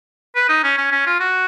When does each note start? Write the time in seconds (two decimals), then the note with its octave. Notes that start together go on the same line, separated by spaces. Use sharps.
0.36 B4
0.49 D#4
0.64 C#4
0.77 C#4
0.92 C#4
1.06 F4
1.20 F#4